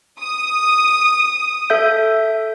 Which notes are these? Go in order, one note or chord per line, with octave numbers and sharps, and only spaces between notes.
D#6
A4 E5 G6